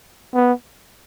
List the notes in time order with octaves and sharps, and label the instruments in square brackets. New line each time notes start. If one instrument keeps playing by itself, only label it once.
[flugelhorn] B3